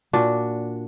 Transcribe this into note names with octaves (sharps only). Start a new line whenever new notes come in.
A#2 D4 F#4